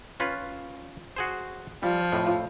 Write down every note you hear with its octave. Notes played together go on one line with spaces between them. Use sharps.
C#4 F4 B4
F#4 G#4 C5
F3 G3
F2 A2